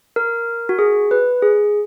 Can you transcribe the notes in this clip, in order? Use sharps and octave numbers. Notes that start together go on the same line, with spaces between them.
A#4
F#4
G#4
B4
G#4